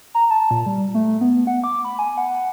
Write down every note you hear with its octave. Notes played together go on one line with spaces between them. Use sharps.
A#5
A5
A#2
G3
A3
B3
F#5
D6
B5
G#5
F#5